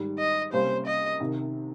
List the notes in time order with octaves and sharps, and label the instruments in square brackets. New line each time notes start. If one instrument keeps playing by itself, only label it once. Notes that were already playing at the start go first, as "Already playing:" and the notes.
Already playing: [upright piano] G#2 D#3 G3
[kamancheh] D#5
[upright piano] C#2 C3 G3 A#3 C#4 [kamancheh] C5
[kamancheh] D#5
[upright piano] C2 C3 D#3